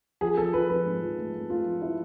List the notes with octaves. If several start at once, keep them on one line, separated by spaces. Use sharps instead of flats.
F3 G#4
F3 A4
F3 B4
F3 B4
G#2
F3
A3
A3
A3 F4
F3
F3 E4